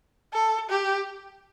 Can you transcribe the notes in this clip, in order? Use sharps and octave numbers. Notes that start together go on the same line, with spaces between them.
A4
G4